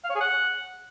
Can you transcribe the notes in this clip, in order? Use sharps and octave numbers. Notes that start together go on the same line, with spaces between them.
F5
C#5
G#4
F#5